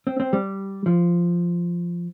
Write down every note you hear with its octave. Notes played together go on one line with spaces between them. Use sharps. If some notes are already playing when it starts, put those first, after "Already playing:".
C4
C4
G3
F3